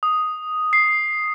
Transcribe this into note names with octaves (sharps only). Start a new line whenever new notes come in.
D#6
C7